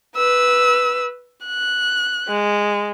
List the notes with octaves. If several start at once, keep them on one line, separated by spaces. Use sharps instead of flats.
B4 E6
F#6
G#3